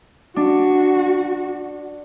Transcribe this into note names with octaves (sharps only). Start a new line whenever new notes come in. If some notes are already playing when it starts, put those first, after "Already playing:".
D4 F#4